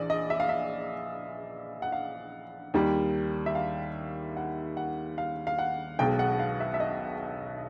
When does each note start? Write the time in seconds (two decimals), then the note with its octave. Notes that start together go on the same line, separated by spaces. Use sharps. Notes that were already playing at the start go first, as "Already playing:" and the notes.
Already playing: A#1 E3 D5
0.10 D#5
0.30 E5
0.40 F5
0.49 E5
1.82 F#5
1.92 F5
2.74 D#2 D#3 G3
3.46 E5
3.55 F5
4.37 F#5
4.77 F#5
5.18 F5
5.47 F5
5.59 F#5
5.99 B1 B2 G#3 G5
6.19 F#5
6.39 F5
6.60 E5
6.74 E5
6.80 D#5